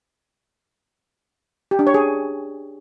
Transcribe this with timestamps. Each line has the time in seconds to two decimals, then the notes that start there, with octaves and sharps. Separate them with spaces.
1.71 G4
1.79 D4
1.87 C#5
1.94 G#4